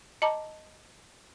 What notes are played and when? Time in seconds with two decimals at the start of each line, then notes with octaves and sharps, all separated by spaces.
0.22 D#5 A5 A#5 D6